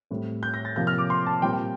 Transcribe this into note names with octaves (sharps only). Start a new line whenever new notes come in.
A2 G3 C4
G6
A#6
A6
C3 F3 A#3 G6
F6
D6
C6
A5
A#2 G3 C4 G5
G5